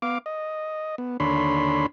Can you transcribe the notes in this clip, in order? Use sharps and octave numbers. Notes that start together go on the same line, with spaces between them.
B3 F5 D6
D#5
B3
D#2 D3 D4 C#5 B5 C6